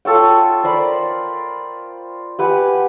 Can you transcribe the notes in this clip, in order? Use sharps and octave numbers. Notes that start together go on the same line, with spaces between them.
F4 A4 C#5 G5
A#4 C5 D5 B5
G4 B4 F#5 G#5